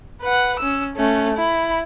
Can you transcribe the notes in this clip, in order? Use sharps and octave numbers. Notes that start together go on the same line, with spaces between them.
B4 F#5
C#4 E6
A3 C#4
E4 B5